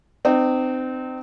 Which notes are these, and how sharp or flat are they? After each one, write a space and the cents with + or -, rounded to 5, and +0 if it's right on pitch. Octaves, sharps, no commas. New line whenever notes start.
C4 -25 D#4 -45